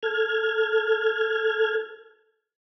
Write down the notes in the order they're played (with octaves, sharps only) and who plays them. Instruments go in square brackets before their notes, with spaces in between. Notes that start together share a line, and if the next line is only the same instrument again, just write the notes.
[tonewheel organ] A4 F6 G#6